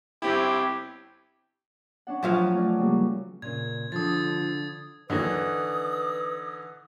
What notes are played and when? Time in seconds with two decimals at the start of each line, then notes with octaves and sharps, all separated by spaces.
0.22 G1 C4 E4 G4
2.07 C#4 D4 F#5
2.23 F3 F#3 F5 G#5
2.53 A3 C#4 D5
2.78 C#3 G3 A#3
3.42 A#2 C#3 G#6
3.92 D3 F3 D#6 G#6 A6
5.10 G1 D#2 D3 E3 F#3 D#4 B4 D#6